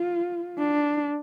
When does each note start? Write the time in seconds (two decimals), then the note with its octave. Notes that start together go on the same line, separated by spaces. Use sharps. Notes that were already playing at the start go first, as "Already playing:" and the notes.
Already playing: F4
0.58 D4